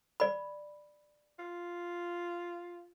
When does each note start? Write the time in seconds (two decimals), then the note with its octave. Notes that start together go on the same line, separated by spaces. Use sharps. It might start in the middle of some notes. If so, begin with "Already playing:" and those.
0.20 D5 B5
1.39 F4